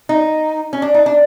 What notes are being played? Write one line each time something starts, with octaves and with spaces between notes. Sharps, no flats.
D#4
C#4
D4
D#4
D4